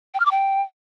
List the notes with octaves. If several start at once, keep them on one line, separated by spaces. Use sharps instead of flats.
G5
F6
D6
G5